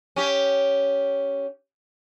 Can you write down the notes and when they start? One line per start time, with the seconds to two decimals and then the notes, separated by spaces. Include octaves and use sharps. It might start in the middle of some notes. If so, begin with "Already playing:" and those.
0.16 C#4 G4